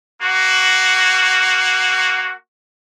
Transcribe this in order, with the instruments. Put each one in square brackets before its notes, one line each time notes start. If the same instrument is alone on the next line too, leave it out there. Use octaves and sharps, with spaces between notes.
[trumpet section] A#3 F#4